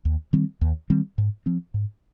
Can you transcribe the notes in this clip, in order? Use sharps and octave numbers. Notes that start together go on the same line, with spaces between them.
D#2
D#3 G3 C4
D#2
D#3 G3 C4
G#2
F3 C4
G#2